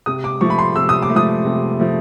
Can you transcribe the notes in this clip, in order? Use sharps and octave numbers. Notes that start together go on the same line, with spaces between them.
C3 D#6
D6
F3 A3 C#6
B5
C6
C3 E6
D#6
D6
A3
F3 D#6
C3
F3 A3